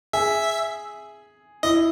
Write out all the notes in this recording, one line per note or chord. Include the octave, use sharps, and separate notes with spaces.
G#4 E5
E4 D#5